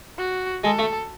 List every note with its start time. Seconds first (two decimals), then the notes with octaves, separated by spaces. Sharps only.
0.18 F#4
0.64 G#3 A4
0.79 A3